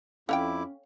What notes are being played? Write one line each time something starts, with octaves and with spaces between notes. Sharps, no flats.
F2 C#4 E4 A4 C#5 F5 G5 D6